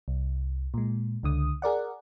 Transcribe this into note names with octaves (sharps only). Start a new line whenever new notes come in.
C2
A#2 G#3
C#2 D3 D#6
G#4 A#4 D5 F#5